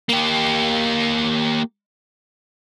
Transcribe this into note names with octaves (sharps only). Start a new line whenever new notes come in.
A#3 G4